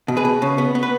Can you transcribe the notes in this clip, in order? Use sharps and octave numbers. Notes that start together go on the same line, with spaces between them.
B2
G#4 B4
B2
C#3
B3
B3
B4